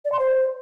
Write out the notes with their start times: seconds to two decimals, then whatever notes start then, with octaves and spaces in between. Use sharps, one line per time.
0.05 D5
0.12 C6
0.19 C5